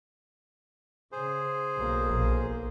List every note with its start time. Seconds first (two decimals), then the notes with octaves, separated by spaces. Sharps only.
1.12 C#3 G#4 C5
1.76 B1 A#3
2.11 A#1